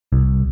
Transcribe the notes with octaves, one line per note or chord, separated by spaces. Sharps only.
C2